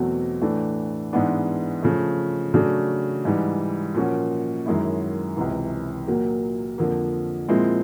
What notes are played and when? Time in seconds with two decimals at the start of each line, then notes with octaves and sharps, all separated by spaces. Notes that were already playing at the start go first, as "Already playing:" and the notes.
Already playing: E2 B2 F#3 A3 C4
0.41 A2 E3 A3 D4
1.13 G#2 E3 G#3 B3 D4
1.83 C#3 F3 A3
2.54 C#3 F#3 A3 D4 F#4
3.25 G#2 E3 G3
3.95 A#2 F3 A#3 C#4 F#4
4.66 F#2 D#3 G#3 C#4 E4
5.37 C#2 C3 E3
6.07 A#2 F#3 A#3
6.78 F2 D3 F3 A#3
7.48 A#2 F3 G#3 C4 E4